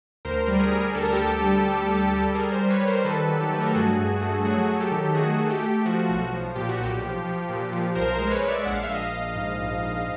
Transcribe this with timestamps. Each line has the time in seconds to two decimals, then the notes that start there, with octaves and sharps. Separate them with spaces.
0.25 D2 A#4 C5
0.48 G3
0.59 G#4 A#4
0.72 G3
0.95 D2 A4
1.03 A#4
1.12 G4 A4
1.19 D2
1.41 G3
1.65 D2
1.88 G3
2.11 G3
2.29 A4
2.35 G3 G#4 A#4
2.52 A#4 C5
2.58 G3
2.70 B4 C#5
2.81 G3
2.88 A#4 C5
3.04 D#3 A4 B4
3.29 F#3
3.39 G4 A4
3.52 A3 B4
3.61 A#4
3.68 A4
3.75 G2 F#4 G#4
3.99 G2
4.21 A3
4.45 F#3 F#4 G#4
4.69 F#3
4.80 G4 A4
4.92 D#3
5.15 A3 F#4 G#4
5.39 A3
5.50 G4
5.62 A3
5.85 F3 F#4
6.09 B1 F#4
6.32 F3
6.56 A#2 G4
6.69 F#4
6.79 B1 G4
7.02 F3
7.25 F3
7.49 A#2
7.73 F3
7.95 B1 A#4 C5
8.13 A#4 C5
8.18 G#3
8.31 B4 C#5
8.42 G#3
8.48 D5 E5
8.65 A#1 F#5
8.74 F5
8.83 E5
8.89 A#1 D#5 F5
9.12 A#1
9.36 G#2
9.59 A#1
9.83 G#2